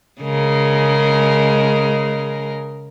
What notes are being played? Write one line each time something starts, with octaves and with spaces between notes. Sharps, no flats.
C#3 G#3 A#4